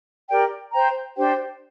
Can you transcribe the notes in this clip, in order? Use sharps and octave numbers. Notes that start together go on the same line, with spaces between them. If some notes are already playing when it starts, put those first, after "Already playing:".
G4 A#4 D5 G5
C5 G5 A#5
D4 G4 C5 G5